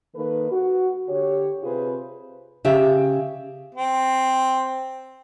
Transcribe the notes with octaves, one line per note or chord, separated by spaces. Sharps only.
D#3 A#3 A4 B4
F#4
D3 G4 C#5
C3 F4 G#4 B4 C5
C#3 G4 E5
C4